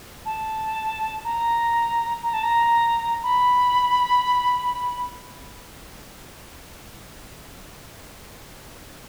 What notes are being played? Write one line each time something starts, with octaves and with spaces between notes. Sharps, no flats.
A5
A#5
A#5
A5
A#5
B5